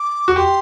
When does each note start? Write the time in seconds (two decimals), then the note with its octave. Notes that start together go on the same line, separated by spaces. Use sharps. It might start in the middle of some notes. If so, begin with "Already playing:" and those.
Already playing: D6
0.28 F#4
0.36 G4 C6